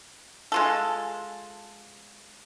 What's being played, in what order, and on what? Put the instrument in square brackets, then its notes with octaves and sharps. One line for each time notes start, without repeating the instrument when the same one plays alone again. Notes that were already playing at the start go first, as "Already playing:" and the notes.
[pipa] G#3 F4 A4